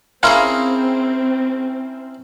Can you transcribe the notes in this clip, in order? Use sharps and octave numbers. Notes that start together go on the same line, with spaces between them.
C4 C#4 E4 G#4 A#4 F5 A#5 C6